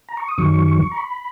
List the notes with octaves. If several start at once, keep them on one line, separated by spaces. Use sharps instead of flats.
A#5
C#6
D#6
F#2 D#3 F#3 C#6
A#5
B5